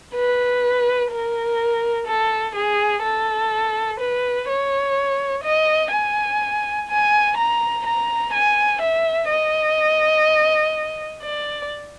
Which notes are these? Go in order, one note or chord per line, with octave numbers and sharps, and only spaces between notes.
B4
A#4
A4
G#4
A4
B4
C#5
D#5
G#5
G#5
A#5
A#5
G#5
E5
D#5
D5